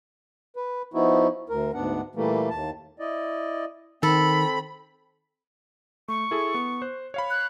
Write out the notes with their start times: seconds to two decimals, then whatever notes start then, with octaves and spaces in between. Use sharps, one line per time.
0.56 B4
0.94 F3 B3 D#4 E4 F#4
1.49 D2 A#4
1.74 D2 G#2 B3 D4 F#5
2.15 A#2 E3 G3 A3 A#3
2.50 D#2 A5
2.99 E4 D5 D#5
4.03 D#3 C4 A4 B5
6.08 A3 C#6
6.31 E4 G#4 A4
6.54 B3
6.82 C5 F#6
7.14 C#5 F5 B5
7.30 F#6